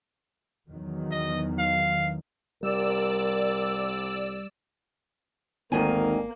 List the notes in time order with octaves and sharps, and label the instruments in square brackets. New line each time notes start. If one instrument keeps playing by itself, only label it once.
[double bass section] E2 D#3 F#3
[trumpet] D#5
F5
[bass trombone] C2 [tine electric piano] G3 [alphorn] A#4 [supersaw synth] D5 E6
[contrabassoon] G#1 [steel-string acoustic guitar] D2 D#3 G#5 [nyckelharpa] A#3